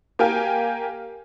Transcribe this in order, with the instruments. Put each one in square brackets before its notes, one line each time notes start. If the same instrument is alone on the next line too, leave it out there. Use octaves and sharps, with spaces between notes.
[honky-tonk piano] A#3 G4 A#4 F5 G5 G#5